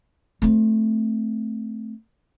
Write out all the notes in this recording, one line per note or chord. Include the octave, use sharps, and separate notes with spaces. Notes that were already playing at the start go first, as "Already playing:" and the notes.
A3 C4